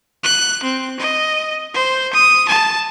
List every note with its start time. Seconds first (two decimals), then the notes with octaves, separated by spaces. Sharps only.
0.23 F#6
0.63 C4
0.99 D#5
1.74 C5
2.13 D#6
2.49 A5